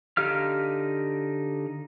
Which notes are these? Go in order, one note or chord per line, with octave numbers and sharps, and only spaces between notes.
D3 D#4 G4 F5 F6